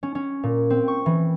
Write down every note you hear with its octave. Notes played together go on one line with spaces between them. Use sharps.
C#4
C#4
A#2
C4
C#6
E3